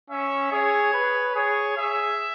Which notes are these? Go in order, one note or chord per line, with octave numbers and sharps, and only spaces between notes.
C#4 E5
G#4 C#5
B4
G#4 C#5
G#4 E5